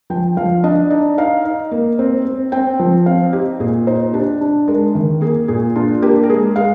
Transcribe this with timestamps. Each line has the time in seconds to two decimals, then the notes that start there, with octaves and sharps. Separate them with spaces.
0.10 F3 G5
0.37 F3 F5
0.64 D4 D#5
0.90 D#4 D5
1.18 D#4 F5
1.45 D#4
1.71 A#3
1.99 C4
2.25 C4
2.52 C4 G5
2.80 F3
3.06 C4 F5
3.33 D#4 G4
3.60 A#2 G#4
3.87 D#4 C5
4.13 D4 G4
4.41 D4
4.68 G#3 A#4
4.95 D#3
5.21 A#3 G#4
5.48 A#2 G#4
5.75 D4 F4
6.02 A#3 G4
6.23 A#4
6.29 G#3 G#4
6.56 G#3 F5